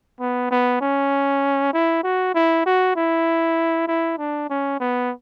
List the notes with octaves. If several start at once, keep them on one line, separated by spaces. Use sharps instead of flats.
B3
B3
C#4
E4
F#4
E4
F#4
E4
E4
D4
C#4
B3